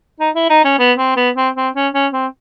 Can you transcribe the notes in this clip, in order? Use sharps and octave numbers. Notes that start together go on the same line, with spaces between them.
D#4
E4
D#4
C#4
B3
C4
B3
C4
C4
C#4
C#4
C4